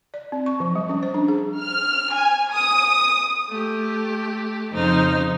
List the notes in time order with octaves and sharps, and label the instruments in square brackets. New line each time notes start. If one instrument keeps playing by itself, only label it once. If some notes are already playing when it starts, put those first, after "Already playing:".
[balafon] D5
C4
C#6
F3
G3
C#4
C5
D4
G#4
[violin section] F6
G#5
D#6
[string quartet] A3 G4
F2 C#3 D#4 C5 F6